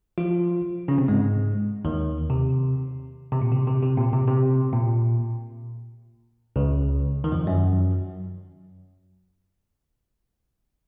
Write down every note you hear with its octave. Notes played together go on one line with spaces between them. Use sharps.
F3 F4
C#3 C#4
C3 C4
G#2 G#3
D#2 D#3
C3
C3
A#2
C3
C3
C3
A#2
C3
C3
A#2
C#2 C#3
D#3
F2 F3
F#2 F#3